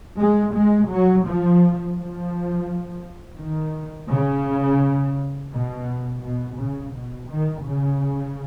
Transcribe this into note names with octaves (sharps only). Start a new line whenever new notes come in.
G#3
G#3
F#3
F3
F3
D#3
C#3
B2
B2
C#3
B2
D#3
C#3